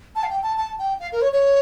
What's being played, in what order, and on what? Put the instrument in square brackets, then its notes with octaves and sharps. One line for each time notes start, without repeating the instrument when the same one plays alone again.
[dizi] A5
F5
G5
A5
A5
G5
F5
A#4
C#5
C#5